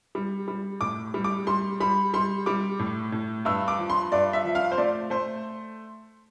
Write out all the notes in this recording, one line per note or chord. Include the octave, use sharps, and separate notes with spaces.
G3
G3
A2 D6
G3
D6
G3 C6
G3 B5
G3 C6
G3 D6
A2
A2
G2 E6
D6
F3
C6
G2 D5
E5
F3
F5
C5
A3 D5
A3 C5